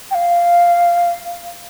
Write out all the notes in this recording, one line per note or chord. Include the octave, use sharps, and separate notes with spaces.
G5
F5